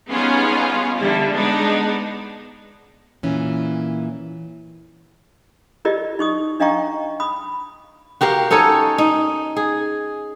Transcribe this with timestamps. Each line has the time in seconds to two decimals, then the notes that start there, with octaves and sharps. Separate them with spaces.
0.12 G3 B3 C#4 D#4 F4 G#4
0.98 D3 G3 E4
1.35 G#3 B3 D4 D#4
3.23 A#2 E3 C#4
5.85 E4 F4 G4 A#4 D5 D#5
6.19 D#4 C#6 D#6
6.60 D4 D#5 F5 G5 A#5 C#6
7.20 B5 D#6
8.21 F#4 G4 A#4 F5
8.50 C#4 D#4 A4 C#5
8.98 D#4
9.57 G#4